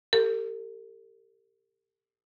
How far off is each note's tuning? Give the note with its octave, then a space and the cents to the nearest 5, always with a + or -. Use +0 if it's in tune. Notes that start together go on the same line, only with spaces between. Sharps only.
G4 +10 A#4 -45